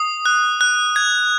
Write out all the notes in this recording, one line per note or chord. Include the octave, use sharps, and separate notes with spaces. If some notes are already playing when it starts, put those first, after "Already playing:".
Already playing: D#6
F#6
F#6
G#6